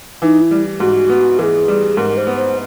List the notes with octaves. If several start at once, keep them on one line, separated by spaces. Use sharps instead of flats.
E3 D#4
E4
G3
G#2 F#4
B3
E3 G#4 A#4
G3
G#2 A#4
C5
B3
C5